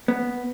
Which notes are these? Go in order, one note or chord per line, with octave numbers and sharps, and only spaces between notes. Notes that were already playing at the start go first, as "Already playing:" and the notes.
B3